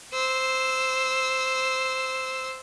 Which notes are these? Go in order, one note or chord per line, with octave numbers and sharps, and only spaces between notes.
C5 E6